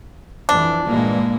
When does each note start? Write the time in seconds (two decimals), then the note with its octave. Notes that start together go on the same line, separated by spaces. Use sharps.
0.49 F2 E3 D4
0.87 G2 A#2 E3 G#3 A#3